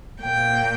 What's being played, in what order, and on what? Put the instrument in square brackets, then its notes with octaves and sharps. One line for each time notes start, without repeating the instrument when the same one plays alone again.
[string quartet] A#2 G5